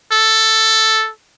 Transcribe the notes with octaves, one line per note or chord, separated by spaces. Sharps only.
A4